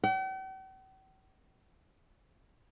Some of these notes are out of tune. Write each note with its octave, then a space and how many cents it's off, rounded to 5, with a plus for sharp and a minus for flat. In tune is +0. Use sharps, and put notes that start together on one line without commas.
G5 -45